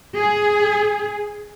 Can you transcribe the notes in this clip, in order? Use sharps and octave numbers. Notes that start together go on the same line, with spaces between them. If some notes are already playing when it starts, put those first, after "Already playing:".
G#4